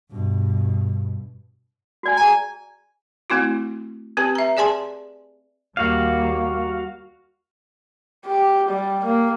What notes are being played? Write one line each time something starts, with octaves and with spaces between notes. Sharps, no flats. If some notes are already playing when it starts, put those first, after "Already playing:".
G2 B2
F#4 D5 G#5
G#4 G#5 A#5
A3 C4 E4 F#4
C4 G4 B4 A5
E5 A#5
G#4 D5 G#5 A5 C6
D#2 G3 A#3 F#4 F5
G4
G3
A#3